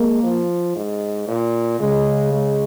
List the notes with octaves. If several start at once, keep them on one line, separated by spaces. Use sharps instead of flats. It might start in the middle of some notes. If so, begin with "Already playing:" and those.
Already playing: G#3 A#3
F3
G#2
A#2
C#3 G#3
G#3